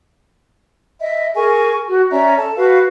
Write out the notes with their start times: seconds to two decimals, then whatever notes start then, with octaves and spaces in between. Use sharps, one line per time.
1.00 D#5 E5
1.35 G#4 A#4 G#5 C#6
1.88 F#4
2.11 C#4 D5 E5 A#5
2.37 A4 A5
2.55 F#4 B4 F5